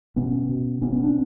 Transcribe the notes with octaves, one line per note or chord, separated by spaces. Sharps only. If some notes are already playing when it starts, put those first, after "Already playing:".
B2 B3 C#4
B2
B2 B3 C#4
B3 C#4
C4 D4